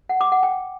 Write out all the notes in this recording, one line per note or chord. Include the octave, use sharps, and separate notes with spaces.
F#5
D6
F#5
G5